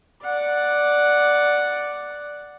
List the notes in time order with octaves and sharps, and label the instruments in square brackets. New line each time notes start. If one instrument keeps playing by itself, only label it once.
[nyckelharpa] D5 F#5